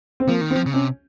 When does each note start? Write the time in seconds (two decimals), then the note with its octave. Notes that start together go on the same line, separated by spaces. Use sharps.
0.20 C4
0.28 F3 A#3
0.41 D#3
0.50 C4
0.56 F3
0.66 C#3
0.73 C3 C#4